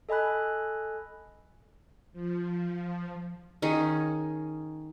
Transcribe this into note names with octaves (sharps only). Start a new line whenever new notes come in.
A4 D#5 G#5 B5 F#6
F3
D#3 C#4 D#4 G#4